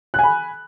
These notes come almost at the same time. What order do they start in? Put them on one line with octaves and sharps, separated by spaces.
F#6 G#5 B5